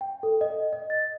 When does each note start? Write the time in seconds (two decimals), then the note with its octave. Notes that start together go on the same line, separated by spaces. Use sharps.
0.01 G5
0.23 A4
0.41 D#5
0.73 D#5
0.90 A6